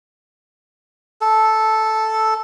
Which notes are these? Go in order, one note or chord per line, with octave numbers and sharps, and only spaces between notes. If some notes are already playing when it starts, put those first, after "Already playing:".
A4